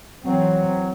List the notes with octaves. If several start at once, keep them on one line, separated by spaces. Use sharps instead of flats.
E3 F#3 C4